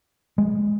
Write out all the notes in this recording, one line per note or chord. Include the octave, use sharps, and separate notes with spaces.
G#3